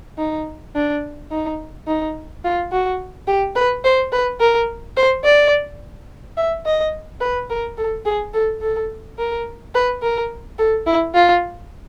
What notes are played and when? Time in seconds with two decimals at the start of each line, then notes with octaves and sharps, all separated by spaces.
0.18 D#4
0.75 D4
1.31 D#4
1.87 D#4
2.44 F4
2.72 F#4
3.27 G4
3.56 B4
3.84 C5
4.12 B4
4.40 A#4
4.97 C5
5.24 D5
6.37 E5
6.66 D#5
7.21 B4
7.50 A#4
7.78 A4
8.05 G#4
8.34 A4
8.62 A4
9.18 A#4
9.75 B4
10.02 A#4
10.59 A4
10.87 E4
11.14 F4